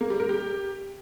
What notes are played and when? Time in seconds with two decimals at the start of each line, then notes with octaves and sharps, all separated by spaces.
0.01 A#3
0.10 G3
0.20 A#4
0.29 G4